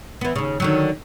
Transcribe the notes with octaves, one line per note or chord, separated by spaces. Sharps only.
E3 B3
D#2 C#3
D3 D#3 F#3